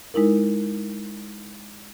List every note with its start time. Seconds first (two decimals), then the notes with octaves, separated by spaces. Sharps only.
0.14 G#3 D#4 E4 A#4